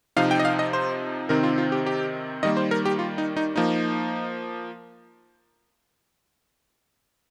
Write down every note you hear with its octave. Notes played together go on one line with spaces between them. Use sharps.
C3 F3 D#4 F5
G5
D#5
F5
D#5
C5
C3 D#3 C4 D#4 A#4
F4
F4
G4
G4
D#3 G3 A#3 D#5
C5
A#4
G4
F4
D#4
D#4
F3 A#3 D#4